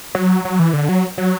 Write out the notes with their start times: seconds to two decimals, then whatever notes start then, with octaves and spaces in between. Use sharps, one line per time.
0.15 F#3
0.45 F#3
0.59 E3
0.73 D3
0.89 F#3
1.18 F#3